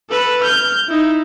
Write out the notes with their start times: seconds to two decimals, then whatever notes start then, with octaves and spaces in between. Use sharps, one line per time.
0.10 A4 B4
0.44 F6 G6
0.88 D#4 E4